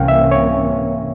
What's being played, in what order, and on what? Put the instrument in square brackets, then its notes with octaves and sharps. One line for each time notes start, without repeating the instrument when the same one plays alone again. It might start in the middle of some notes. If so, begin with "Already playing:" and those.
Already playing: [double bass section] C2 C3 E3 A#3 C#4 [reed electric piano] F5 G5
[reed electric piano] E5
C#5